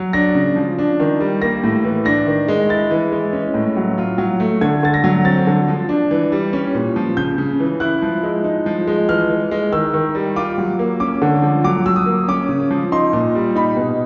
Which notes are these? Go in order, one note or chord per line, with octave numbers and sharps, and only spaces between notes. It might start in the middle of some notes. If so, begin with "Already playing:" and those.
Already playing: F#3
D4 A#6
C#3
F3
D4
D#3
G3
A#3 A#6
A2
E3
D4 A#6
D#3
G#3
E4 A6
E3
G#3
C#4
A2
F#3
F4
F#3
A3
D3 G#6
D3 A6
A#6
F#3
C4 A6
D3
F3
D4
E3
G3
C#4
A#2
F3
C#3 G6
C#3
E3
E4 F#6
F3
G#3
D#4
F3
G#3
E3 F6
E3
G#3
D#3 E6
D#3
G3
F4 D6
F#3
A#3
C#4 D6
D3
F3
F#3 D6
F#3 E6
D#6
A#3
C#4 D6
C#3
F3
D#4 C6
A#2
G3
D#4 B5
B2